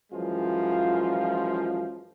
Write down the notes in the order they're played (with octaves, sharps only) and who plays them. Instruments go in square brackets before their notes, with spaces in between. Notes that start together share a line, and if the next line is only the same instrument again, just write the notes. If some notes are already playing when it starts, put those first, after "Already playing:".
[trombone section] F#2 E3 F3 G#3 F4